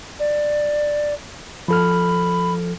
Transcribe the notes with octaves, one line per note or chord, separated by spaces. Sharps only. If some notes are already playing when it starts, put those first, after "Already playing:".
D5
F3 A4 B5 F6